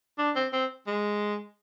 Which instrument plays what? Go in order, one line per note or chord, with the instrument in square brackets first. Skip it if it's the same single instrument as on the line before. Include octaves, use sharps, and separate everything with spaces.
[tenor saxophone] D4
C4
C4
G#3